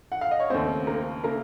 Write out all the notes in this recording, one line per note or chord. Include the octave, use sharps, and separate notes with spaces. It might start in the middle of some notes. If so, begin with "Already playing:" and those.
F#5
F5
D#5
C#5
D#2 C#3 A3 C4 C5
A#3 A#4
C#3 A3 A#3 A#4